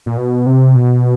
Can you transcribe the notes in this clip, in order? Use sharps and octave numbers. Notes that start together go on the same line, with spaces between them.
A#2
B2
C3
B2